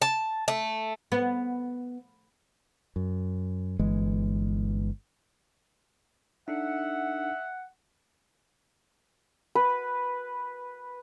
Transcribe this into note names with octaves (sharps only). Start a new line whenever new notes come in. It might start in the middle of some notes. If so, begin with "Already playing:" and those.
A5
A3
B3
F#2
G1 E3 G#3
D4 D#4 A4 E5 F#5
B4